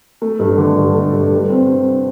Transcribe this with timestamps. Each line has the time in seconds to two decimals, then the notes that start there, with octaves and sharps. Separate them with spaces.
0.22 A3
0.39 G2
0.58 D3
0.77 G2
0.95 A3
1.13 G2
1.32 G3
1.50 C4
1.68 C3